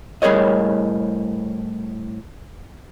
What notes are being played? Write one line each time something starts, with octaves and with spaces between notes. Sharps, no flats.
A2 G3 G#4 A#4 C#5 D#5